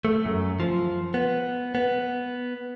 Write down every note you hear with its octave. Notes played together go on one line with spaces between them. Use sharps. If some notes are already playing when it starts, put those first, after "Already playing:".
A3
F#2
F3
B3
B3